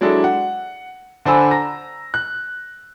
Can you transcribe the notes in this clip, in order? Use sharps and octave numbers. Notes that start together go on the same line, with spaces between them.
F#3 G#3 D4 E4 A4
F#5
D3 D4 C5 G#5 B5 E6
A#5 A#6
F#6